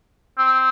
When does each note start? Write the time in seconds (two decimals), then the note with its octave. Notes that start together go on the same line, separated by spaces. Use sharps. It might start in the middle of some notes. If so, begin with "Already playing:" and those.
0.38 C4